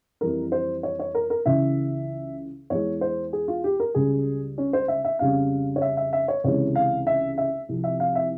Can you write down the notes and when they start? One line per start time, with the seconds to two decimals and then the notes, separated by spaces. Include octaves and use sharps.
0.21 F2 E3 G3 A#4
0.52 C5
0.83 C#5
0.99 C#5
1.15 A#4
1.30 A#4
1.46 C#2 C#3 E3 E5
2.70 E2 E3 G#3 C#5
3.01 C5
3.33 G#4
3.48 F4
3.64 G4
3.80 A#4
3.95 C#2 C#3 G3 G#4
4.58 C#4
4.73 C5
4.88 E5
5.04 E5
5.19 F2 C#3 G3 F5
5.76 C#5
5.82 E5
5.97 E5
6.13 E5
6.28 C#5
6.44 C#2 C3 E3 G#3 C#5
6.75 F5
7.07 E5
7.38 E5
7.69 C2 C3 F3
7.84 E5
8.00 F5
8.15 E5